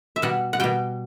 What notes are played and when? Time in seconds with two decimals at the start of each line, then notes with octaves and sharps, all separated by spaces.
0.16 E5
0.22 B2 G3 F#5
0.53 F#5
0.60 B2 G3 G5